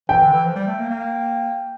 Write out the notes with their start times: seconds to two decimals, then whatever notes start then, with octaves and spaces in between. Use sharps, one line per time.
0.09 E3 G5
0.21 D3
0.33 E3
0.44 F3
0.55 G3
0.67 A3
0.78 A#3
0.89 A#3